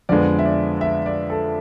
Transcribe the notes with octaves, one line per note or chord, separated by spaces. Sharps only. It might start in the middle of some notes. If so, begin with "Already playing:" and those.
F2 D3 G#3 B3 D5
E5
D5
E5
D5
A4